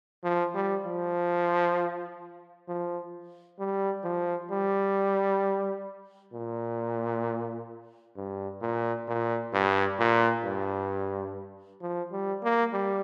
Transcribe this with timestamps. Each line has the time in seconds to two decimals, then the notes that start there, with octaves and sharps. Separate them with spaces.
0.23 F3
0.55 G3
0.85 F3
2.68 F3
3.59 G3
4.04 F3
4.51 G3
6.33 A#2
8.16 G2
8.61 A#2
9.08 A#2
9.53 G2
9.99 A#2
10.44 G2
11.81 F3
12.12 G3
12.43 A#3
12.73 G3